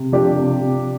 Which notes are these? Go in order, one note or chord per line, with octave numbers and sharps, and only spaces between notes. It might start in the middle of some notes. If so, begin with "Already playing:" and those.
Already playing: C3
F3 D4 G4
C3
C3